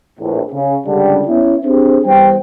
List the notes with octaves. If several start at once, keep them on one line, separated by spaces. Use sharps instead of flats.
A#1 E2 A2
C#3
C#2 D3 G3
B3 C#4 E4
C4 D4 G4 G#4 C5
E2 G3 C5 G5